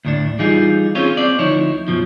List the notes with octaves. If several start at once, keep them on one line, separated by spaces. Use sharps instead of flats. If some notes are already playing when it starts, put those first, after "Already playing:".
D2 A2 D4
E3 G3 D#4 F4 G#4
C4 C#4 F4 G#4 C#5
C4 D5
D2 F3 D#4 E4 C#5
F#2 B2 F3